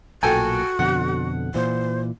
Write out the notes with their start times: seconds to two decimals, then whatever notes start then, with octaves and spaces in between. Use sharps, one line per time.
0.23 B1 A#2 F#4 A4 G5 G#5
0.79 F2 B2 D3 F#5
1.54 A#2 E3 C5